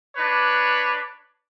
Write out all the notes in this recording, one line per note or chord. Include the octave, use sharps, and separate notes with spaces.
D4 B4 C#5